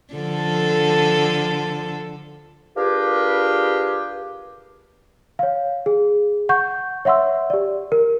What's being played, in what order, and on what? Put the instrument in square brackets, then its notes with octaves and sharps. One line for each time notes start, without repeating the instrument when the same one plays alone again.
[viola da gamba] D3 F3 A4
[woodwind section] D4 F4 G4 G#4 A#4 B4
[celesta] C#5 F5
G#4
F#5 C#6 G6
C#5 E5 F#5 C6 E6
G4 D5
A#4